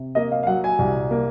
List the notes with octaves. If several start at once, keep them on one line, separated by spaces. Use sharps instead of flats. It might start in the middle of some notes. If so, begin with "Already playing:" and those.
Already playing: C3
A#3 D#5
F5
F5
F#3 F#5
G#5
C2
A#3